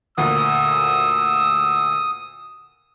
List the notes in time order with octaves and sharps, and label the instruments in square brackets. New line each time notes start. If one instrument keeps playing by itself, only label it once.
[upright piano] D2 A#2 [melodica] D#6 [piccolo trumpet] E6